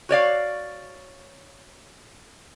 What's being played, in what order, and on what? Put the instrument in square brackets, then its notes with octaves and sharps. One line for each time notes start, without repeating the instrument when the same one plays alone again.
[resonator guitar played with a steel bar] F#4 C#5 D5 F5